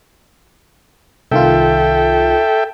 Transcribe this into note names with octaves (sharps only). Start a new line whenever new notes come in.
C2 D#3 F4 A4 E5 G5